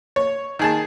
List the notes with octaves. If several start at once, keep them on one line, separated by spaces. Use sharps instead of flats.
C#5
D#3 G#4 A5